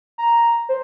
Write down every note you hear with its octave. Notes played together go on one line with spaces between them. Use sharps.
A#5
C5